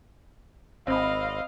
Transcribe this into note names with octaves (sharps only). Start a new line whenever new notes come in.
G#1 C4 D#5 F5 B5